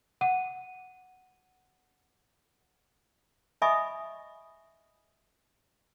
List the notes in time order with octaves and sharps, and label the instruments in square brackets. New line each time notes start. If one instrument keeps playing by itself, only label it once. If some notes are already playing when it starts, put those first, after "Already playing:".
[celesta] F#5 D#7
[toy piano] D#5 E5 G#5 B5 C#6 D#6